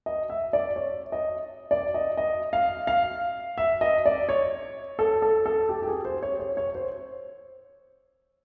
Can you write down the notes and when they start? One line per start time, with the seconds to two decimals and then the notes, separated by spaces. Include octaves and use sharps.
0.06 D#5
0.30 E5
0.53 D5
0.76 C#5
1.12 D#5
1.71 D5
1.94 D#5
2.17 D#5
2.53 F5
2.87 F5
3.58 E5
3.81 D#5
4.06 D5
4.29 C#5
4.99 A4
5.22 A4
5.46 A4
5.69 G4
5.82 G4
5.87 G#4
6.05 C5
6.22 C#5
6.39 C#5
6.57 C#5
6.75 C5